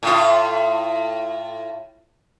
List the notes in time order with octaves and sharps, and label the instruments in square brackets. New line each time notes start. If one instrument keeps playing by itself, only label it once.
[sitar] A2 F4